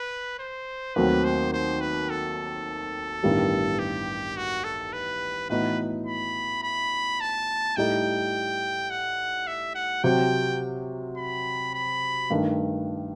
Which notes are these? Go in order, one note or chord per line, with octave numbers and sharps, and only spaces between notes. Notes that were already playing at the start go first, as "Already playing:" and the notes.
Already playing: B4
C5
D#2 D#3 F#3 A3 C4 B4
C5
C5
B4
A4
A1 G2 D#3 G3 B3
G4
F#4
A4
B4
A2 E3 B3 D#4 F#4 B4
B5
B5
A5
A2 G3 D#4 A4 G5
F#5
E5
F#5
C3 F#3 C4 G5
B5
B5
G2 D#3 A3 D#4